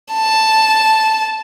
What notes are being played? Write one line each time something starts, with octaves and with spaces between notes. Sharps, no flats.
A5